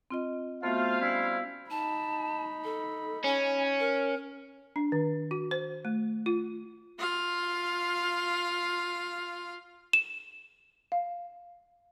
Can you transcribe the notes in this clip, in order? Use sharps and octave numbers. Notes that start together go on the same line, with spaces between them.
C4 F4 D#5
A3 B3 F4 F#4 C5 F5
G3 C#4 E4
D#4 A5 B5
A4
C#4 G#5
A#4
D4
D#3
F#4
C5
A3
F4
F4 F5
E7
F5